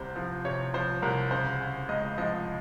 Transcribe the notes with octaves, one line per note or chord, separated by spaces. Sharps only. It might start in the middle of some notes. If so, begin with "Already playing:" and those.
Already playing: C2 C3 C5
F3
C3 C#5
F3 C5
C2 A#4
C#3 C5
C#3
C#2 D#5
F3 D#5